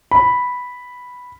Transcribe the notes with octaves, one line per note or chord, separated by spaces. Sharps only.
B5